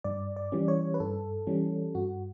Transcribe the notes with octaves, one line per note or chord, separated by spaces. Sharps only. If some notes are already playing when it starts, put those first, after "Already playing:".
G2 D5
D5
E3 G3 C#4
C#5
B4
G2 A4
E3 G3 C#4
G2 F#4